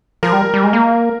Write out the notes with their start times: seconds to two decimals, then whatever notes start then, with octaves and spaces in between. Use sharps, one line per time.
0.23 F3 A#4
0.33 G3
0.54 G3
0.64 G#3
0.73 A#3